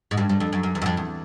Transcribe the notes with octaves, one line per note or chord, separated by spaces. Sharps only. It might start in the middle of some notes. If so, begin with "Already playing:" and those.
G#2
G2
G2
F2
F#2
F#2
E2
F#2
F2
E2